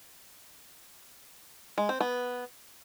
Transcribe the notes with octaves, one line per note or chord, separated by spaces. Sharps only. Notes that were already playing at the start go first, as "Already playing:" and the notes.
G#3
C4
B3